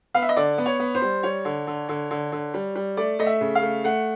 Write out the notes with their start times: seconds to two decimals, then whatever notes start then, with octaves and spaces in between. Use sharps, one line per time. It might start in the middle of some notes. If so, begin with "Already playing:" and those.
0.14 B3 F5
0.22 E5
0.29 D#5
0.36 D3 D5
0.58 B3
0.66 C#5
0.79 B3
0.95 C5
1.02 G3
1.23 G3 C#5
1.45 D3
1.67 D3
1.89 D3
2.11 D3
2.32 D3
2.54 G3
2.75 G3
2.97 A3 D5
3.19 A3 D#5
3.27 E5
3.41 C#3
3.55 F5
3.62 A3
3.84 A3 F#5